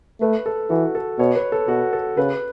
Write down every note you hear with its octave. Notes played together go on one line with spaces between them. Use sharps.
A3 B4
A4
E3 F#4
A4
B2 C#5
B4
A4
B2 F#4
A4
C#3 B4